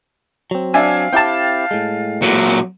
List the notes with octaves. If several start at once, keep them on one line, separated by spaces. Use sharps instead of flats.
F#3 C4
D4 E5 F5 G#5
C4 E4 G4 G5 A5
A2 G#3
A#2 F#3